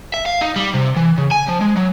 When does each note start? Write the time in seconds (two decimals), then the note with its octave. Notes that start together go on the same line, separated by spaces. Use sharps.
0.14 E5
0.26 F5
0.41 D#4
0.56 G3
0.74 C3
0.96 E3
1.18 C#3
1.31 G#5
1.49 F3
1.61 G#3
1.77 F#3